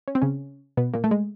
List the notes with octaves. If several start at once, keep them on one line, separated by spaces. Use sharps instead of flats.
C#4
C4
C#3 C#4
B2 B3
A#2 A#3
A3
G#3